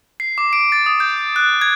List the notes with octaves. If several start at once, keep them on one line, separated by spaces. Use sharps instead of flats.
C7
D6
D7
A6
D#6
G6
F#6
G#6